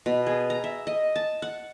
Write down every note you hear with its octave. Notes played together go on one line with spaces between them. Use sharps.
B2
G#4
A#5
E5
D#5
A5
F#5